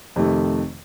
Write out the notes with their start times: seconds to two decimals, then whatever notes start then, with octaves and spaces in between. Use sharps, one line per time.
0.16 F2 C3 D#3 A3